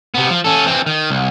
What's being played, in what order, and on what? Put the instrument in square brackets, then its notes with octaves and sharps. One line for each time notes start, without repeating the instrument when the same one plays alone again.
[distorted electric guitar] C3 B3
F3
C#4 A4
E3 C4
D#3
C2